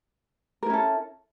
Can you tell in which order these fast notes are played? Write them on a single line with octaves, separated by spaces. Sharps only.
A#4 E4 C#4 A4